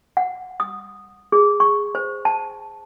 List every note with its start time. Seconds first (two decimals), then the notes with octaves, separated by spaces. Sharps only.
0.17 F#5
0.60 D#6
1.32 G#4
1.60 C#6
1.95 C5
2.25 A5